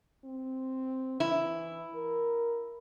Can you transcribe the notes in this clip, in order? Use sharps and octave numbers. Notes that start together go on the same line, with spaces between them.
C4
E3 E4
A#4